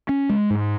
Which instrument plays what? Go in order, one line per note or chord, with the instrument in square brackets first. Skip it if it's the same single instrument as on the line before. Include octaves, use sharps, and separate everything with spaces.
[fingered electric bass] C#4
G#3
G#2